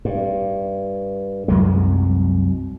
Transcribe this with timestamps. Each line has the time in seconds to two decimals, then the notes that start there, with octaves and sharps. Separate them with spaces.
0.05 G2
1.48 C2 F#2 F#3 G#3